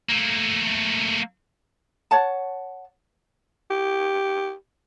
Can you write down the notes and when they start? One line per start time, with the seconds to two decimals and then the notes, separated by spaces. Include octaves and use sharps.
0.09 A3 A#3
2.11 C#5 F#5 A5
3.71 G4